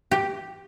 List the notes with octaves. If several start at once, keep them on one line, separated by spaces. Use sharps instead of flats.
G4